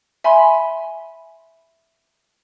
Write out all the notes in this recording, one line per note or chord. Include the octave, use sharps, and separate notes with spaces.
E5 G#5 B5 C6